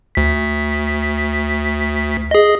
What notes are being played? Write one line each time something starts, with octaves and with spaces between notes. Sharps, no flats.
D2 B6
G#4 D#5